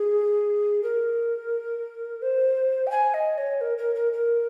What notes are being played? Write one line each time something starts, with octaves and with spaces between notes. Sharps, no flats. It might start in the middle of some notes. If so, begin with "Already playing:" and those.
Already playing: G#4
A#4
C5
G5
G#5
D#5
C#5
A#4
A#4
A#4
A#4